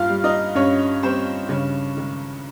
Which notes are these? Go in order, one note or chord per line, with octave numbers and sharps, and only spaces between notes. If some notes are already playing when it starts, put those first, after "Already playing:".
Already playing: G2 F4 F5
G3
D#4 D#5
G2 C#4 C#5
G3 C4 C5
G2 C#3 C#4
D#3 G#3